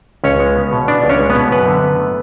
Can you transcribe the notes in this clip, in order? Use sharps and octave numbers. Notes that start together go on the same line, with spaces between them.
C#2 C#4 C#5
G#3
B3
B2
B3 D4 D5
C#2
C#4 C#5
G#3
B3 B4
B2
F#2 B3 B4
D3
F#2
A3